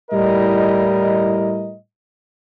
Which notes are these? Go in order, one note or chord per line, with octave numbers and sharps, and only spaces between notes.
A2 G3 E4 A#4 D#5